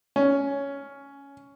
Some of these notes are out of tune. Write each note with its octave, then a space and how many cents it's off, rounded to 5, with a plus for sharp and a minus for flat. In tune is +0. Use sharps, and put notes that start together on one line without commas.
C#4 +10